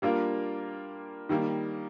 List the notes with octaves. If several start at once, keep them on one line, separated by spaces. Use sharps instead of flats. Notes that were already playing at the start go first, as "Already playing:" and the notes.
G3 A#3 D4 F4 A#4
D#3 G3 A#3